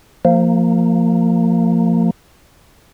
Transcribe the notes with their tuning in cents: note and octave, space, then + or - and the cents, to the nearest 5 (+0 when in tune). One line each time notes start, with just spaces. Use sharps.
F3 +0 A#3 -25